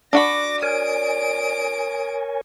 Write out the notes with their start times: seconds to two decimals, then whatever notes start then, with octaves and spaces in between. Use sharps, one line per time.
0.13 D4 F#4 D5 B5 D6 A#6
0.62 A#4 C#5 G#5 D#6 D7